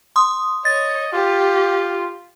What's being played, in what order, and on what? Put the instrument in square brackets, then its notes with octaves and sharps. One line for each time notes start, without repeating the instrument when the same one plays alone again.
[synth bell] C6 D#6
[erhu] C#5 [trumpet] D#5 [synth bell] A6
[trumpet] F4 [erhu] G4